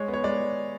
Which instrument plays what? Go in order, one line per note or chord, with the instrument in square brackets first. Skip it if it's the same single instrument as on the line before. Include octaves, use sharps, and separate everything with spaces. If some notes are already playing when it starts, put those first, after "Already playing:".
Already playing: [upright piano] G#3 C#5
B3
C#5
G#3 D5